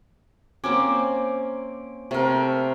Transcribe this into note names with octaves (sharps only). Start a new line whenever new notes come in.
A#3 C4 C#4 D6
C3 A3 A#4